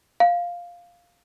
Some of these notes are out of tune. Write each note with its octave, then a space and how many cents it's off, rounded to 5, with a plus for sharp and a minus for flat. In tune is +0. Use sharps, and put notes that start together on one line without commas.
F5 +0